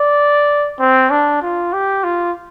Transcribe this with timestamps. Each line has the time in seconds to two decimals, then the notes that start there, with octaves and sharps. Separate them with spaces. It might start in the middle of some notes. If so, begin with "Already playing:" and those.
Already playing: D5
0.80 C4
1.11 D4
1.42 F4
1.73 G4
2.04 F4